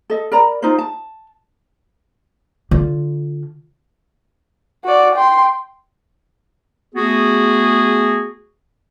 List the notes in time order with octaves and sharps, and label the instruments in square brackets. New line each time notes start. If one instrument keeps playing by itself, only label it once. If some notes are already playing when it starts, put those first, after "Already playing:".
[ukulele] A4 D#5
A#4 D5 A#5 B5
D#4 F4 A#4 C5
A5
[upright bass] D3 F4
[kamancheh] F#4 D5
G5 C6
[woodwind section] A3 B3 F#4 G#4